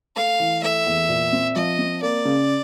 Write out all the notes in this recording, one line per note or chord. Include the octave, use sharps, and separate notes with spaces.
A3 F5
E3
A3 E5
E2
A#2
C4
F3 D#5
C4
A#3 D5
C#3